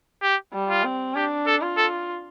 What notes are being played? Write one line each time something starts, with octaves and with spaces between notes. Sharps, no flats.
G4
G3
F4
C4
D4 G4
A4
F4
A4